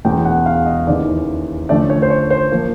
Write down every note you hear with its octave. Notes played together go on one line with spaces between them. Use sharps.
E1 E2 B2 G#3 C#4 G5
F#5
F5
D#5
D#2 C#3 E3 D5
D2 D3 F3 A3 C#4 D5
C#5
C5
C#5
C5
F3 A#3